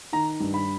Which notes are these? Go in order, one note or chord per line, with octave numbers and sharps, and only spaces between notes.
D#3 A#5
G2
B5